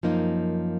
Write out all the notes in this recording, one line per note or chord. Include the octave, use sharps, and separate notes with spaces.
F#2 F3 A#3 D#4